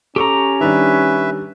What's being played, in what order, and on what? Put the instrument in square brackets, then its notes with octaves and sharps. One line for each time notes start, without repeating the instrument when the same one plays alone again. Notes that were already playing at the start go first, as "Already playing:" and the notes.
[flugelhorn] C#4 [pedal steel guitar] G4 A#5 [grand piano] A4 C#6 D6
[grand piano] D#3 G3 D4 [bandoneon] B4 E5